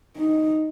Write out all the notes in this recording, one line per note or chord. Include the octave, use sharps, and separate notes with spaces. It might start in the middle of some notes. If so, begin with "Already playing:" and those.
D#4